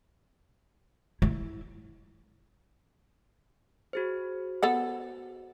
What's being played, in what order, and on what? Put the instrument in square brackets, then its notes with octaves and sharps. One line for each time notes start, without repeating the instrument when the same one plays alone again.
[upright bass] E4
[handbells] F#4 G#4 C5
[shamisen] B3 A4 F#5